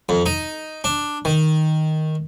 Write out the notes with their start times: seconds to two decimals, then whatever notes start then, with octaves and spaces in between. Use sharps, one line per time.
0.09 F2
0.26 D#4
0.84 D4
1.25 D#3